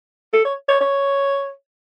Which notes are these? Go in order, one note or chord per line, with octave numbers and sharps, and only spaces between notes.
A4
C#5
C#5
C#5